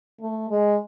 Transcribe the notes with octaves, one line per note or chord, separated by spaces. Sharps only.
A3
G#3